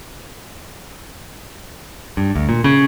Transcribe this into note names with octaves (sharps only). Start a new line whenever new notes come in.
G2
D2
A#2
C#3